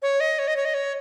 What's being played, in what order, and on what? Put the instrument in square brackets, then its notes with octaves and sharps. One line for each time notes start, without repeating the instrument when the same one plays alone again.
[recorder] C#5
D#5
C#5
D#5
C#5
D#5
C#5